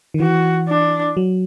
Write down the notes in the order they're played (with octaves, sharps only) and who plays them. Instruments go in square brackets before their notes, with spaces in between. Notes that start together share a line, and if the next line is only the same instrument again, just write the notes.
[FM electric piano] D#3
[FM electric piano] E3 [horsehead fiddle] F#4
[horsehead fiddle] D4
[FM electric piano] F#3